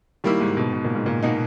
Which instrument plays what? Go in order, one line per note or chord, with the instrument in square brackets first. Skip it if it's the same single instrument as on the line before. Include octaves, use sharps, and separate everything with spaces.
[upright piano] D#3 [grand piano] G3 A#3 E4
[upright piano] G#2
B2
B2
A#2
G#2
A#2
[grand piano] B2 A#3 D#4